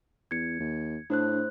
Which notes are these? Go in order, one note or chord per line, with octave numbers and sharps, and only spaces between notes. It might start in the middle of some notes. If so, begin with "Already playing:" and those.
E2 G#6 C#7
D#2
A2 A3 D4 C5 F#6